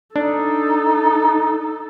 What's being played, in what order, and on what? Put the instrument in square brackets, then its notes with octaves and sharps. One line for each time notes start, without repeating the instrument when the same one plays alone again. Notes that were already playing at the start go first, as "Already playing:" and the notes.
[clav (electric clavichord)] D4 [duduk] D#4 [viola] A4